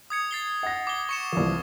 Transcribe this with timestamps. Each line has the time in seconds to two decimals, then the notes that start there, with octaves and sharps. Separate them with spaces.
0.10 D#6 G#6 C#7
0.31 A6 C7 G7
0.63 F#5 A#6
0.87 D6 G7
1.09 C#6 C#7 E7
1.32 C2 E3 F3